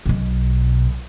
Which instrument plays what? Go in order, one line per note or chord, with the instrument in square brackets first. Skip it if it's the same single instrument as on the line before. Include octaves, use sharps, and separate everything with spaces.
[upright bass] B1 B2